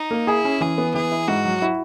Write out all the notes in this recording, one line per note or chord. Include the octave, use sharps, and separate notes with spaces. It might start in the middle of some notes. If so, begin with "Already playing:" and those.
Already playing: D#4
A#3
E4 G#4
C#4
E3 G#4
B3
E3 G#4
E4
G#2 F#4
F#3
E4